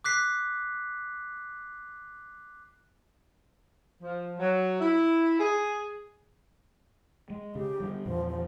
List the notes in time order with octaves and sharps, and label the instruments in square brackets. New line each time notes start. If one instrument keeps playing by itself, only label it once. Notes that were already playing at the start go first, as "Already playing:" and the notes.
[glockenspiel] D6 F#6 B6 C7
[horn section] F3
F#3
E4
G#4
[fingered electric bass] G#3
[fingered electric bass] C#3 [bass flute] G4
[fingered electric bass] D3 G3
[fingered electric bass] E2 A#2 [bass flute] F3
[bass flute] F3